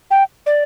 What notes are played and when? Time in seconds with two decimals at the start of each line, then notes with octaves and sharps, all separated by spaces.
0.11 G5
0.46 D5